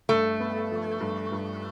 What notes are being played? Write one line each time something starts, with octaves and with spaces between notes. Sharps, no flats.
G2 A3
B3
F3
G2
G2